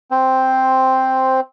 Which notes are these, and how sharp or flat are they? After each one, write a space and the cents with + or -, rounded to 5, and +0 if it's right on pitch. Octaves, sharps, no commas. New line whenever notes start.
C4 +0 C5 +0